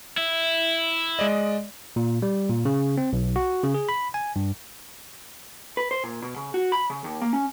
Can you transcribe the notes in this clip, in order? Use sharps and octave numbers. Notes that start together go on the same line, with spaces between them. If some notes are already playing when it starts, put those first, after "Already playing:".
E4
G#3 D5 D#5
A#2
G3
A#2
C#3
C4
B1
F#4
C#3
G#4
B5
G#5
G2
B4
C5
A#2
B2
C#3
F#4
B5
C#3
D#2
A#3
C#4